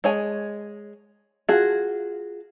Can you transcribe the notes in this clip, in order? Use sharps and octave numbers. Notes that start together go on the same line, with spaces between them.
G#3 C#5 G#5
F4 F#4 G#4